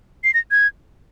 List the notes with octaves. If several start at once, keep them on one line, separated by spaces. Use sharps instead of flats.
C7
A#6
G#6